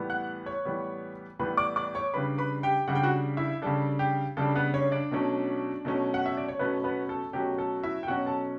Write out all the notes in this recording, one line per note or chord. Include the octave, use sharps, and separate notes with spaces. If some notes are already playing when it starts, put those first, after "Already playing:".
Already playing: A2 E3 G3 B3
F#5 F#6
C#5 C#6
A2 E3 G3 B3
A2 E3 G3 B3 B4 B5
D5 D6
D5 D6
C#5 C#6
C#3 G3 D4 B4 B5
B4 B5
G4 G5
C#3 G3 D4 F#5
G5
F#4 F#5
E4 E5
C#3 G3 D4 A4
G4
C#3 G3 D4 A4
B3 B4
C#4 C#5
D4 D5
B2 F#3 A3 C#4
B2 F#3 A3 C#4
F#5
E5
D5
C#5
B2 F#3 A3 B3 C#4 B4
B3 B4
A4
B2 F#3 A3 C#4 G4
A4
E4 E5
G5
B2 F#3 C#4 F#4 F#5
A4 A5